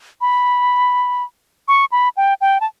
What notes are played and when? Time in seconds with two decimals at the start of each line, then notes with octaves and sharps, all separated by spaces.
0.21 B5
1.68 C#6
1.92 B5
2.17 G5
2.41 G5
2.61 A5